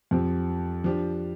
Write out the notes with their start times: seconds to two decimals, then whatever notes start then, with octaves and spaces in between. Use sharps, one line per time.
0.11 F2 F3 C4 G4
0.84 F3 D4 G4